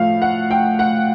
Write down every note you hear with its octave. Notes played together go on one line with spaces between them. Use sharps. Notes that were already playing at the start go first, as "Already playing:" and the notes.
Already playing: A2 F3 A3 F5
F#5
G5
F#5